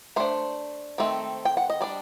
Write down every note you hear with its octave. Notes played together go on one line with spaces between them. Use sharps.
A3 D4 C5
D#3 A3 C4
G5
F#5
D#5
G3 D4 D5